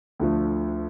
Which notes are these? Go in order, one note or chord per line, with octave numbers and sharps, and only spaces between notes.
D2 D3 F3 A3